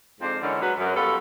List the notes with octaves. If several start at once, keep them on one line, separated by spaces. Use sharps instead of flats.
F2 G#2 D4 F4 C5
D3 E3 G#3 A#3 C#4
F#3 G#3 B4
F#2
G3 B3 F4 F#4 A4